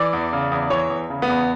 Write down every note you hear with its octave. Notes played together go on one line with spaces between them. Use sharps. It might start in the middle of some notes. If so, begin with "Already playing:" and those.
Already playing: E3 D5
E2
C#3
E2
E3 C#5
E2
C#3
B3
E2